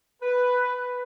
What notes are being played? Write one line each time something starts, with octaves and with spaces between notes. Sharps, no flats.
B4